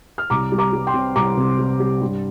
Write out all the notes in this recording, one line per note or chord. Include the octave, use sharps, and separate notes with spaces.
F6
C2 A#5 D6
G3
A#5 D6
G3
G5 C6
C3
C2 A#5 D6
C3
G3
G3
G2